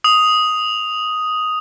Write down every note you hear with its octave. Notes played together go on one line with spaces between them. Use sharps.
D#6 F7